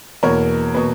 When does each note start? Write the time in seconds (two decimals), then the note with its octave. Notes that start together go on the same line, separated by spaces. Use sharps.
0.23 E2 B2 A#3 A#4 C#5
0.74 B2 A#3 B4